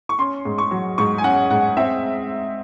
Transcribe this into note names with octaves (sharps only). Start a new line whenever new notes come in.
C#6
C#4 C6
G#2
C#6
F#3
G#2 C#6
G#5
C#4 F#5
G#2 F#5
C4 E5